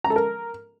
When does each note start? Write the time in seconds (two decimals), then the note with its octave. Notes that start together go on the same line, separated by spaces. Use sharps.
0.04 A#5
0.10 A4
0.16 A#4